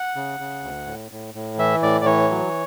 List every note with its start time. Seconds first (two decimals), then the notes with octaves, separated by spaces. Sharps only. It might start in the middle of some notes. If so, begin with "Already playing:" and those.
Already playing: F#5
0.16 C#3
0.40 C#3
0.63 D2
0.87 A2
1.11 A2
1.34 A2
1.59 E3 E5
1.83 A2 D5
2.01 D5
2.05 E3 C#5
2.30 F#3